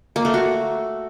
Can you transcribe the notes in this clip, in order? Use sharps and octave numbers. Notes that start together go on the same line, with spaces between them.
A#3
A3
F#4